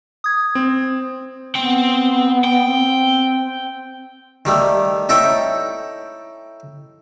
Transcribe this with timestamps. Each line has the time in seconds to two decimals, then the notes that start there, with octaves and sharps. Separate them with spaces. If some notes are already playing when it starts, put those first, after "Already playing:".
0.24 D#6 G#6
0.55 C4
1.55 B3 C4 G5
2.44 G5
2.65 C4
4.45 D#3 G3 A3
5.09 D#4 E4 A4 C#5 G5